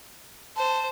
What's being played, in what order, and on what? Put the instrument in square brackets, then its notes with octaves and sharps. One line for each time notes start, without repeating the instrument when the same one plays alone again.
[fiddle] C5 [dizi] A5